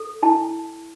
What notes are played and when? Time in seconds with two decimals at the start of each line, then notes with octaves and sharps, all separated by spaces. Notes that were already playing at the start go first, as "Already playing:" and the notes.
Already playing: A4
0.23 E4 A5